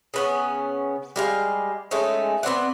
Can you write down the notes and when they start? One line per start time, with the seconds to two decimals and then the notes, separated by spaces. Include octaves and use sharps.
0.14 C#3 B3 C#4
1.16 G3 G#3 F5
1.91 G#3 A3 C#4 D#4
2.43 B3 C4 D5 F#5